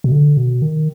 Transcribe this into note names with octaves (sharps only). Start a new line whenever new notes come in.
B2
D3
B2
D#3